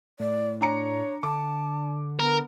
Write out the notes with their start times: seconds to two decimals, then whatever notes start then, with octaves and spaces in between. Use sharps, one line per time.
0.20 A2 D5
0.61 D4 C#5 A#5 C#7
1.23 D3 A5 D6
2.19 B3 A#4